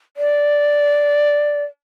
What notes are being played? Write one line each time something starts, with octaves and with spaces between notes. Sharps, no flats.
D5